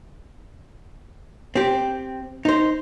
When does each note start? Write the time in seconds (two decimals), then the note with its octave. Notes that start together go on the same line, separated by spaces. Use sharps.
1.55 C4 G4
2.45 D#4 C5